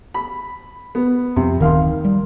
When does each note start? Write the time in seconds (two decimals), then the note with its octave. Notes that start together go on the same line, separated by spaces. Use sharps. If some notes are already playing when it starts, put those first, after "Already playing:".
0.14 B5
0.95 B3
1.36 F2 C3
1.60 D1 D#3 A#3 F5 C6
2.05 G3